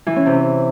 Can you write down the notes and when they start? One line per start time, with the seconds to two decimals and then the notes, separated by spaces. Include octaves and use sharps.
0.07 E3
0.16 C#4
0.26 C3